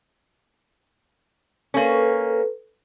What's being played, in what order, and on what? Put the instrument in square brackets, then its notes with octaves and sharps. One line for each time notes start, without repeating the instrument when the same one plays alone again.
[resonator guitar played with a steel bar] A#3 C#4 [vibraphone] A4 B4